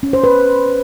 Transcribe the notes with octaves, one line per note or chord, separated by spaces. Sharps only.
C#4
C5
B4